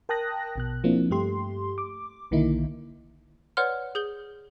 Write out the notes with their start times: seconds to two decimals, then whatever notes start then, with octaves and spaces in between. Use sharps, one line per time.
0.09 A#4 G5 A5 D#6 F#6 A#6
0.56 A#1 B2 F#6
0.84 F3 A#3 C4 D4 E4
1.11 G2 A3 G4 C6
1.78 D6
2.31 B1 D3 D#3 A#3 D#4 E4
3.57 B4 C#5 D5 F#5 C6 F6
3.95 G#4 G6 G7